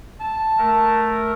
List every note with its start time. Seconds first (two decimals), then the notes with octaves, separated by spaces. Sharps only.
0.20 A5
0.58 A3 A#4